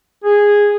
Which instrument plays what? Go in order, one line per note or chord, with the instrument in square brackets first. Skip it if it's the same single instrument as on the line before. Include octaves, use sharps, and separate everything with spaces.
[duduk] G#4